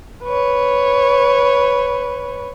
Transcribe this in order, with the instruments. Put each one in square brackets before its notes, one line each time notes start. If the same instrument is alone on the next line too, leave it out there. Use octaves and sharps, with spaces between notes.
[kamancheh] B4 C#5